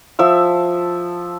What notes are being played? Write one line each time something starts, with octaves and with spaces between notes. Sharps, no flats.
F3 E5 E6